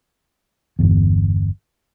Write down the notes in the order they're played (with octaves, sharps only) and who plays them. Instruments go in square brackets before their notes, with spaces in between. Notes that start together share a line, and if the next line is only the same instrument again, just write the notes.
[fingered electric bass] G1 E2